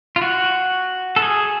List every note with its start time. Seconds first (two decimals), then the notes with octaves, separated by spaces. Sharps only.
0.16 F4
0.22 F#4
1.16 A4
1.22 G#4